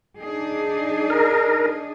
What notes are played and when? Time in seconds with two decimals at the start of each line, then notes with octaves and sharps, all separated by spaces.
0.17 D4 D#4 G#4
1.10 A#4